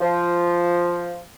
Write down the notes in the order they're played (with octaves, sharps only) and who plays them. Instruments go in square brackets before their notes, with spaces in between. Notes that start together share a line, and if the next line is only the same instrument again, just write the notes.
[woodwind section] F3